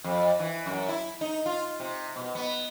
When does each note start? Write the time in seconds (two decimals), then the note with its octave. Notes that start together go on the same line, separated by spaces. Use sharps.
0.04 F2
0.40 E3
0.66 F#2
0.88 E4
1.21 D#4
1.46 F4
1.80 C3
2.16 B2
2.35 B3